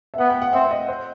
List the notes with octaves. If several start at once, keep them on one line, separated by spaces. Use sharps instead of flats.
E5
B3 F#5
G5
F#5
C4 E5
D#5
C5